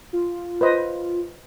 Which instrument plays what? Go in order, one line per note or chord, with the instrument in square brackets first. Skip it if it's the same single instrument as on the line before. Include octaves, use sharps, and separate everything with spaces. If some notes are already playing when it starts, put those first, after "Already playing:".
[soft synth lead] F4
[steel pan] B4 C5 D#5